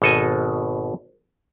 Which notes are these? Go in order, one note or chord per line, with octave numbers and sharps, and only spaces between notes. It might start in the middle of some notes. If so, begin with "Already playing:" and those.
G#1 B2 A4 D#5 G#5